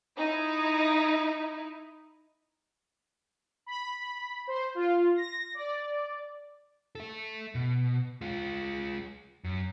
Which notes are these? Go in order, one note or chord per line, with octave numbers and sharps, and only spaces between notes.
D#4 E4
B5
C5
F4
A#6
D5
A4 E5
B2
G#3 F4
F#2